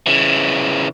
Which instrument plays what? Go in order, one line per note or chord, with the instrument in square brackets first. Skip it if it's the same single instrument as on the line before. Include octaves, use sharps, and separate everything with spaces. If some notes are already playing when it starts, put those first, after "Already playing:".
[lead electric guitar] C#3 E3